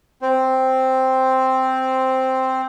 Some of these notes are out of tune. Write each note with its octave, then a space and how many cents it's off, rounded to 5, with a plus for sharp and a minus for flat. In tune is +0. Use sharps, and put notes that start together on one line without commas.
C4 +0 C5 +0